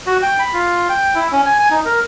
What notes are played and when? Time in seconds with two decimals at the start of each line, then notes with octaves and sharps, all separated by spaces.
0.07 F#4
0.22 G5
0.39 B5
0.54 F4
0.89 G5
1.15 E4
1.32 C#4
1.46 G#5
1.59 G#5
1.71 D#4
1.86 A#4